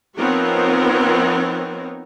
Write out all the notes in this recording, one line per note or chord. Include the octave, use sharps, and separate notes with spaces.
F3 B3 C4 D#4 A#4 C#5